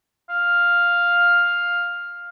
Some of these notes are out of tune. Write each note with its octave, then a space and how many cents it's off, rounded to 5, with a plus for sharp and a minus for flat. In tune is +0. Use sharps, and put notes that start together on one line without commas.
F5 +5